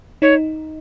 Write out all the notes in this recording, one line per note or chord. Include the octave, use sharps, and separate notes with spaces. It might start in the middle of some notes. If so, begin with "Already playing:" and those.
D#4 C#5